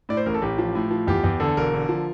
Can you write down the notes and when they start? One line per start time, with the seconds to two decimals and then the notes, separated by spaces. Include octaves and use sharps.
0.09 A2 D5
0.17 C5
0.26 A1 A#4
0.34 A4
0.42 A1 G4
0.58 F3
0.75 A2
0.91 F3
1.07 E2 G4
1.23 E2
1.40 D3 A4
1.57 E1 A#4
1.73 D3
1.89 F3